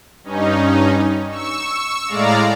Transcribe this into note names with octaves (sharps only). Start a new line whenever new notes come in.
G2 C#4 D#4
C#6 E6
A2 G#3 D5 F5 A#5